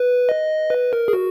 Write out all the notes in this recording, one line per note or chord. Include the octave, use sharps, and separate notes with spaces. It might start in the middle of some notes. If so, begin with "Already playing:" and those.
Already playing: B4
D#5
B4
A#4
G#4
F#4